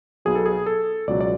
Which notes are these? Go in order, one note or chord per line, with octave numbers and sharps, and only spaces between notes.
B1 B2 F#3 G#4
A4
G#4
A4
C#2 B2 F#3 D5
D5